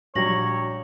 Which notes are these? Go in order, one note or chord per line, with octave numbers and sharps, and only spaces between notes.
A#1 F#3 G3 C#5 A#6 F#7